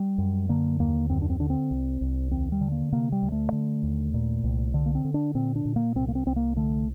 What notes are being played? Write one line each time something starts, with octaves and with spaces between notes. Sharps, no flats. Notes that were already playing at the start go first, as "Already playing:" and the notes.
Already playing: G3
F#2
D3 A#3
D#2 A#3
F#2 C4
D4
C4
D3 D4
C4
C2
C2
D#2 C4
G3
D3
A#3
C3 A#3
G3
D2
A3
D3
D#2
A#2
C2
D3
A#3
C4
D3
D4
A#2 C4
D4
A#2
A#3
C2 C4
A#3
C4
C2 C4
A#3
D3 A3